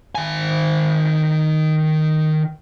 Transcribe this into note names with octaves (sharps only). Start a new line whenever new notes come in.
D#3 G#5